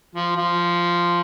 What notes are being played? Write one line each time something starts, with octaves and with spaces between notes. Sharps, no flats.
F3
F3